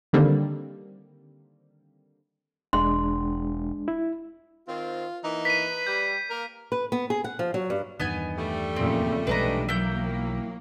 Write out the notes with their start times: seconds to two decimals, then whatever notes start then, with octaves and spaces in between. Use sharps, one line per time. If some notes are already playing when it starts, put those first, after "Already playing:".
0.13 D3 D#3 G3 A#3 C4
2.73 E1 G#3 D4 C6
3.88 E4
4.68 D#3 C4 F4
5.24 E3 A#3 D#4
5.45 B4 B6 D#7
5.87 G3 G6
6.30 A#3 A#4
6.72 B4
6.92 B3
7.10 G#4
7.24 F#5
7.39 F3
7.54 F#3
7.70 G2
8.00 E2 G2 D#3 B3 D#5 G#5
8.37 G3 A3
8.76 F2 A#2 C#3 C4
9.27 B1 E3 F3 G#3 D4 B4 D#5 A#5
9.69 F#3 A#3 E4 G5 G6